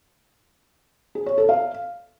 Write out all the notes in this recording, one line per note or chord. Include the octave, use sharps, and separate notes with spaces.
G#4
C#5
A4
F5